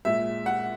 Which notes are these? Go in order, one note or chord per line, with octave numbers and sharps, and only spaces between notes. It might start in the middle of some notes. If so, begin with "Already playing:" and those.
A#2 G#3 E5
F#5